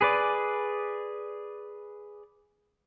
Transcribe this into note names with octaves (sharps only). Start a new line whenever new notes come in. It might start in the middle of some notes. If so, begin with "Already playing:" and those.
G#4 B4 D5